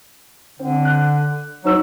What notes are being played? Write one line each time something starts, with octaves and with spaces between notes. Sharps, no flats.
D3 C4
F#6
F#3 D#4 C5 E6